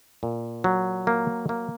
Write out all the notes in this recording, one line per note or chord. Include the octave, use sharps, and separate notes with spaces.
A#2
F#3
A#3
A#3